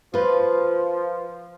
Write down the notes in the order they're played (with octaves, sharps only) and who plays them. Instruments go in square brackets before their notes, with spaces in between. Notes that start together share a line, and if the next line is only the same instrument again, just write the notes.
[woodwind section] F3 [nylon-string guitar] F4 B4